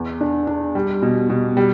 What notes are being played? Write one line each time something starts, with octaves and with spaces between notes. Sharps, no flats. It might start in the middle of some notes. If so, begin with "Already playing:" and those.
Already playing: E2
D4
D4
G3
B2
B2
G3